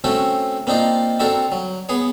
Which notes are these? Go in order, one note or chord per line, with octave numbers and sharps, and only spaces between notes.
A3 C4 C#4 F#4 A4
A#3 C4 D4 D#4 F4
C4 D4 F#4 A4 A#4
F#3
B3 G#4 C#5